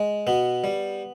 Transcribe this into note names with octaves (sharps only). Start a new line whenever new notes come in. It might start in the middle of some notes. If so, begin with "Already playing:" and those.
Already playing: G#3
B2 B3
G3